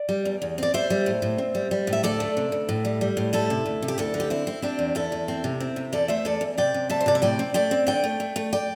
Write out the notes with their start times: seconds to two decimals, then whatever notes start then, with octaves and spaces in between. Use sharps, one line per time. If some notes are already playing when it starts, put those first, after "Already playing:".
Already playing: D5
0.09 G3
0.25 E2
0.42 E2
0.58 C4 D5
0.74 G3 C5 E5
0.90 G3
1.06 A2
1.22 A2
1.38 C4
1.55 G3
1.71 G3
1.87 A2
1.93 E5
2.03 D2 A4 D5
2.20 A3
2.37 C3
2.52 D2
2.69 A2
2.85 G3
3.01 G3
3.17 A2
3.33 G3 E4 A4
3.50 C3
3.66 D2
3.82 C3
3.88 G4
3.98 D2 E4 A4
4.14 D3
4.20 G4
4.30 C4 E4
4.47 C4
4.62 C4 D4 G4
4.79 E2
4.95 E2 E4 A4
5.12 E2
5.28 C4
5.44 C3
5.60 C4
5.76 C3
5.93 E2 A4 D5
6.08 A3 C5 E5
6.25 E2 A4 D5
6.41 E2
6.58 C3 D5 G5
6.74 C3
6.89 G3 E5 A5
7.01 C5
7.06 C3 D5
7.15 E5
7.22 A2 D5 G5
7.39 C4
7.54 A3 D5 G5
7.71 C4
7.87 D3 D5 G5
8.04 A3
8.20 A3
8.36 A3
8.53 D5 G5